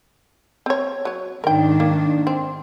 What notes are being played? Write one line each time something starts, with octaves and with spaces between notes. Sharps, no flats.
C4 C#5
F#3 C#5
G#2 D#3 D4 A#4 G5
A#3
C4